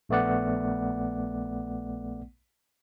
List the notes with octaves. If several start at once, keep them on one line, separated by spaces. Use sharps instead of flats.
A#1 A3 B3 D5 F#5